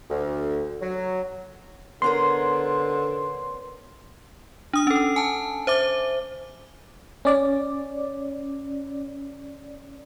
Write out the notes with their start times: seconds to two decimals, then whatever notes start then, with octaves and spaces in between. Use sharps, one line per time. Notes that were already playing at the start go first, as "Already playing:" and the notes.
0.10 D2
0.82 F#3
2.02 D3 B3 C#4 A#4 C6
4.73 D4 D#6
4.87 C#4 A4
5.16 G#5 A5
5.67 C5 E5 D6
7.25 C#4 D5